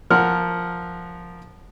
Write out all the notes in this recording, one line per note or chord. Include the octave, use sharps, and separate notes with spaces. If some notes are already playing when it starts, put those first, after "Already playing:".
F3 A#4 F#5 F6